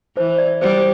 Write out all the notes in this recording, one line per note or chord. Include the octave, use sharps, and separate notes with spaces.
E3 C5
D5
G3 C5